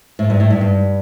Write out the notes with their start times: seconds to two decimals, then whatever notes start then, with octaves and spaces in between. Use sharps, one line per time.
0.19 A2
0.30 G2
0.40 A2
0.50 G2
0.61 G2